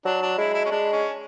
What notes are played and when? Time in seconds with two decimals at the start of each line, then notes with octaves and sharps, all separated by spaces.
0.05 F#3 D4
0.22 D4
0.38 G#3 E4
0.54 E4
0.65 C#4
0.71 G#3 D4
0.93 C#4